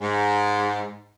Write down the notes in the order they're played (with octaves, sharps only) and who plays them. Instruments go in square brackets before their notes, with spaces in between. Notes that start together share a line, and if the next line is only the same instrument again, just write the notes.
[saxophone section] G#2